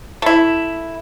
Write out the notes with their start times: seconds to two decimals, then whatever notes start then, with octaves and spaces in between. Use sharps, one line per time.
0.22 A3 E4